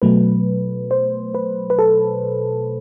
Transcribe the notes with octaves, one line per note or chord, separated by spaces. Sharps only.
B2 F#3 A3 B4
C5
B4
B4
A4